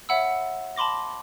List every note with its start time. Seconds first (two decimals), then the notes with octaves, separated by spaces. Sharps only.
0.09 C#5 E5 F#5 B5 E6
0.76 A5 B5 C6 D6 A#6